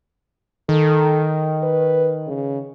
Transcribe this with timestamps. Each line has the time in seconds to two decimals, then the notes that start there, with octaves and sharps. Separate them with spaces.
0.69 D#3 A4
1.63 B4
2.27 C#3